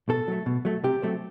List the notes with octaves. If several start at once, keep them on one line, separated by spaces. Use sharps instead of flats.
B2 A4
F#3 A3
B2
F#3 A3
C3 G4
F#3 A3 C4